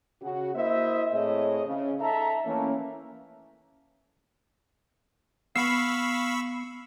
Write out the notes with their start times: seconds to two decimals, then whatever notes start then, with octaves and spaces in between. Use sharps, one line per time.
0.22 C#3 F#4
0.55 A#3 E4 C5 D#5 E5
1.12 A2 C4 G#4 C#5 D#5
1.66 C#3
2.00 D#4 A4 E5 A#5
2.45 E3 A3 A#3 C#4
5.56 B3 F5 B5 C#6 E6 C7